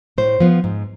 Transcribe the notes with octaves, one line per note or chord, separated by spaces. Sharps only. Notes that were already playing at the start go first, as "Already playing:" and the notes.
A2 C5
F3 B3
G#2